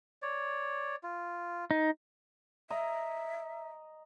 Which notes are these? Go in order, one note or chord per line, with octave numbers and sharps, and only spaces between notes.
C#5 D5
F4
D#4
D#5 E5 A#5